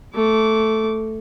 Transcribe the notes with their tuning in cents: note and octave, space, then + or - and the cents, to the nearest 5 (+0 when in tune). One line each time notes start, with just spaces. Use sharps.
A3 +0 D6 -25